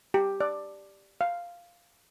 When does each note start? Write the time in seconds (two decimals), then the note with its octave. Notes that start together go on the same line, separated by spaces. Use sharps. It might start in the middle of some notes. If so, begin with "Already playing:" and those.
0.14 G4
0.41 D5
1.21 F5